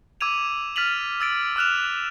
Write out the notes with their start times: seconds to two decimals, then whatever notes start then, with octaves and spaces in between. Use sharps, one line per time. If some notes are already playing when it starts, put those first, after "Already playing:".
0.21 D6 E6 G#6 D#7 F7
0.76 F6 A6 B6 D#7 F7 F#7
1.21 E6 A6 D7
1.56 D6 F6 F#6 E7 F7